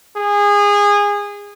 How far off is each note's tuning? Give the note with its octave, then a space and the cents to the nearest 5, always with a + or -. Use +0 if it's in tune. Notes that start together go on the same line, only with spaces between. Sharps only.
G#4 -25